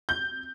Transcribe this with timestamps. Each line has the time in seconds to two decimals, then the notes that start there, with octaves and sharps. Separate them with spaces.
0.09 G6